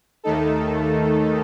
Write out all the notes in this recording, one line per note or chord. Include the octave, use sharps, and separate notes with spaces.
D#2 D#3 A3 D#4 A4